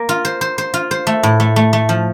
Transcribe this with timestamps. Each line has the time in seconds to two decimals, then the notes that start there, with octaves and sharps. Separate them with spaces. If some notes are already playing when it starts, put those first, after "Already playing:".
Already playing: A#3
0.09 F4
0.25 C5
0.41 C5
0.58 C5
0.74 F4
0.91 C5
1.07 A3
1.23 A2
1.40 A3
1.56 A3
1.73 A3
1.89 F3